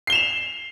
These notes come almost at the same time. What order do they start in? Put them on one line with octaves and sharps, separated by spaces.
C7 G7 E7 F7